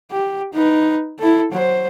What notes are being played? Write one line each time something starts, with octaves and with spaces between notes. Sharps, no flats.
G4
D#4 B4
E4 A4
F#3 C5